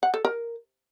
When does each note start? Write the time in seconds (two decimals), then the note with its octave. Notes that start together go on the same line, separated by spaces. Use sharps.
0.03 F#5
0.14 A4
0.25 A#4